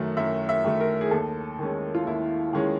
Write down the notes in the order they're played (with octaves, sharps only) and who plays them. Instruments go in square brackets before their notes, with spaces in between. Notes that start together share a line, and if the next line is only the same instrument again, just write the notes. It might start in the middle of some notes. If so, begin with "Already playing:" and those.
Already playing: [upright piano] F#2 D#3 F#3 A3
F#2 E5
E5
D#3 F#3 A3
A#4
G#4
D#2 A4
D#3 G#3 C#4
F4
D#2 E4
D#3 G#3 C#4